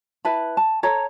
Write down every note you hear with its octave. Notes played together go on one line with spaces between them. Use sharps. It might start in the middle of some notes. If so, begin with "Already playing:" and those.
E4 B4 A5 B5
A5
A4 C#5 A#5